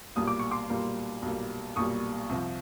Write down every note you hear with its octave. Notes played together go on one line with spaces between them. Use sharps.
B1 A#2 G3 A#3 D#6
D6
C#6
C6 D6
B1 A#2 G3 A#3
B1 A#2 G3 A#3
B1 A#2 G3 A#3 C#6 D#6
C2 C3 F3